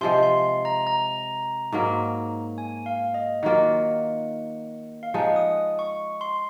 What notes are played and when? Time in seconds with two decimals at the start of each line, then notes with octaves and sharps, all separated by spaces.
0.01 C3 F3 G#3 C6
0.23 C6
0.65 A#5
0.87 A#5
1.72 G#2 F#3 A#3
2.58 G#5
2.86 F5
3.14 D#5
3.43 D#3 F#3 A#3 F4 F#5
5.03 F5
5.14 F3 G#3 D#4 F#5
5.36 D#6
5.79 C#6
6.21 C6